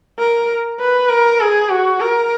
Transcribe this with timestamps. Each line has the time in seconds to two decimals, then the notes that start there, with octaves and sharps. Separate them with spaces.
0.19 A#4
0.80 B4
1.10 A#4
1.41 G#4
1.71 F#4
2.00 A#4